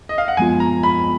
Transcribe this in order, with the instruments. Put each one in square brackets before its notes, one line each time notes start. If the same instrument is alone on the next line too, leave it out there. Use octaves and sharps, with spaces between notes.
[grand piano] D#5
F5
F#5
[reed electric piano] F#2 F3 G#3 B3 F4 [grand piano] G#5
[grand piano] A#5
B5